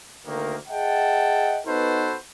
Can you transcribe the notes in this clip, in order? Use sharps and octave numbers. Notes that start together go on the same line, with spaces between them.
D2 D#3 A#3
G#4 D#5 E5 F#5 G5 A5
B3 D#4 F#4 A4 B4 C5